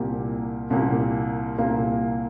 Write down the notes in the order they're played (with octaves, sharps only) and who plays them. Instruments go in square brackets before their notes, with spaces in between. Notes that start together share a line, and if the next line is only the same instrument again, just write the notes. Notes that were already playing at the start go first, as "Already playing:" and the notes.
Already playing: [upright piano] C2 A#2 A#3 G4
C2 A#2 A#3 G4
C2 A#2 A#3 G4